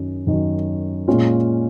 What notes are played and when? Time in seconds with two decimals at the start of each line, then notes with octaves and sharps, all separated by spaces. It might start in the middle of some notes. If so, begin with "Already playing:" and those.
Already playing: F#2 D#3 F#3 C#4
0.27 F#2 D#3 F#3 C#4
1.08 A#2 G#3 C#4 F4